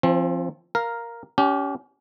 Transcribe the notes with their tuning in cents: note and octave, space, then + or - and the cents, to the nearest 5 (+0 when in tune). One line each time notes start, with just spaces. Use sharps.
F3 -15 C4 +30
A#4 +0 F5 +0
C#4 +30 G4 -15